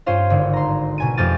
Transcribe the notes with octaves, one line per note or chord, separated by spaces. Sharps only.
G2 C#4 F4 C5 F5
G#1 D3
A#5 C6
B2 G#5 D#7
F2 A3 G4 F6 A6 D#7